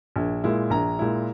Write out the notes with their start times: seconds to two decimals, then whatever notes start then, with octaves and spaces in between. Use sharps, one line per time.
0.16 A#1
0.44 A#2 G#3 E4
0.70 A#1 A#5
0.99 A#2 G#3 E4